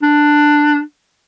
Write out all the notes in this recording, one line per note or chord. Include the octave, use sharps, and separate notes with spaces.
D4